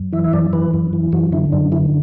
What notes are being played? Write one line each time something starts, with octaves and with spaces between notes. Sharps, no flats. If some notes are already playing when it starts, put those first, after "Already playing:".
Already playing: F#2
E3 E5
E5
F#2 D5
E3 B4
F#2
E3
F#2 F#4
D3 E4
F#2 D4
D3 E4